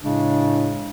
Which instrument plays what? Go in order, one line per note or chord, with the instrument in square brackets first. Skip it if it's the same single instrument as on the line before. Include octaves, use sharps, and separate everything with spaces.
[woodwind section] A2 C#3 G#3 D4